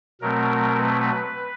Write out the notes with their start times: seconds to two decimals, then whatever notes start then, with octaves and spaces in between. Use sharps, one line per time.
0.21 B2 F#3 A3 C4 A#4
0.77 B4